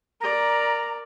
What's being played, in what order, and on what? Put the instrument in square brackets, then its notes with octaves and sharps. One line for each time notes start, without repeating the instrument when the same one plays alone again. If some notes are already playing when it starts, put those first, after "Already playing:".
[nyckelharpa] A#4 D5 [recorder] A#5